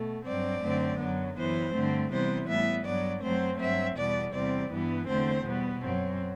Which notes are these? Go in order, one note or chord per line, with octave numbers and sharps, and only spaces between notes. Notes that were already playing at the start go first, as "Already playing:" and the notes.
Already playing: B2 A3
G2 F#3 C4 D5
F#2 D3 A3 C4
F#2 F#3 B3
F#2 E3 B3 C5
G2 D3 A3 C4
C3 E3 G3 B3 C5
A2 G3 B3 E5
G2 F#3 B3 D5
F#2 F#3 A3 C4 C5
G2 F#3 C4 E5
E2 B2 G3 B3 D5
E2 C3 G3 C4 D5
G2 E3 G3 B3
E2 D3 A3 C4 C5
B2 G3 B3
F#2 F#3 C4